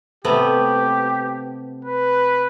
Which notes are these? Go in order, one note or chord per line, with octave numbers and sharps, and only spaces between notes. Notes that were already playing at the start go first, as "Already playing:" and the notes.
C3 A3 B3 G4
B4